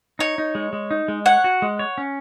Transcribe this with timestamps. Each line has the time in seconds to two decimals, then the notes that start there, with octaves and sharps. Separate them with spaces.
0.19 D#4 C#5
0.38 D#4
0.55 G#3
0.73 G#3
0.91 D#4
1.08 G#3
1.26 C#5 F#5
1.44 F#4
1.62 G#3
1.79 C#5
1.98 C#4